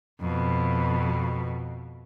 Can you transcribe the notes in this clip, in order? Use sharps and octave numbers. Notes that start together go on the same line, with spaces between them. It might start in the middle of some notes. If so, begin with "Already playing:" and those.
F2 B2